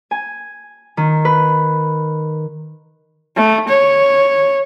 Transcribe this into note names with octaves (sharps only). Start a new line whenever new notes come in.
G#5
D#3
B4
A3
C#5